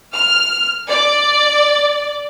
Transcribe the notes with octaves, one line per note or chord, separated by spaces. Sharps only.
F6
D5